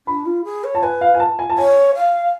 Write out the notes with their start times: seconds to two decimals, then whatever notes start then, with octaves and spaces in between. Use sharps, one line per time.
0.07 D4 B5
0.26 F4
0.45 G#4
0.64 C#5
0.75 A5
0.83 B4 G#5
1.01 F5
1.14 G#5
1.20 A5
1.39 G#5
1.50 A5
1.58 C#5 G#5
1.95 F5